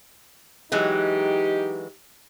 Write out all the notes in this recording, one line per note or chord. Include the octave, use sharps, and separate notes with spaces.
E3 F#3 G#3 D#4 G4